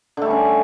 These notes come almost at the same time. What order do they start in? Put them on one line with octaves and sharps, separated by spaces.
D3 A3 G3 C#4